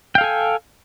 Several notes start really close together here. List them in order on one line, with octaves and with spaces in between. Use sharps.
G5 F5 A4 G#5